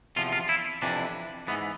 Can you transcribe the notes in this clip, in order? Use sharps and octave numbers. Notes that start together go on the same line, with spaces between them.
E2 C3 F3 F4
F4
E4
F2 C3 E3 D4
G#2 E3 B3